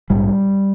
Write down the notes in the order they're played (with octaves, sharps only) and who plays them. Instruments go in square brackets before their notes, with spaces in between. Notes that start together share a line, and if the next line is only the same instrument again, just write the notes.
[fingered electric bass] A#1 G#2 G3